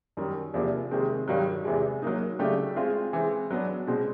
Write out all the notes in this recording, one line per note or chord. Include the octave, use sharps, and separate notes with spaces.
F#2 D#3 G3
E2 C3 F3 A#3 D4
C3 D#3 G#3 C4
G2 D#3 F#3
E2 C3 E3 G#3
F#3 A#3 D#4
C#3 F#3 A3 D4 G4
G#3 C4 F4 G#4
E3 G#3 C4
F#3 B3 D4
B2 G#3 C4